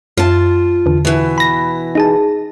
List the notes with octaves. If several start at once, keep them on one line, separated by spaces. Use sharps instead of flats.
F#2 F4 A5
E2 D3
B2 E3
B5 A#6
D#4 G#4 A5